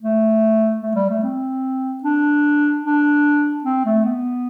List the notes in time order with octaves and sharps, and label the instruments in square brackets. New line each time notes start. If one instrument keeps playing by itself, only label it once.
[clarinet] A3
A3
G3
A3
C4
D4
D4
C4
A3
B3